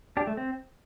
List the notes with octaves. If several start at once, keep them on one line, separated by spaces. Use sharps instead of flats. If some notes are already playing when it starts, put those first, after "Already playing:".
D4 G4
A3
C4